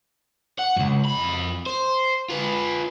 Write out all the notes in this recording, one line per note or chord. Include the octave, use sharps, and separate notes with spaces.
F#5
C#2 F#2
F2 B5
C5
F4 B4